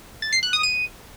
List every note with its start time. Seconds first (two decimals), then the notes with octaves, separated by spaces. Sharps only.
0.22 A6
0.33 C7
0.43 F#6
0.53 D#6
0.63 D#7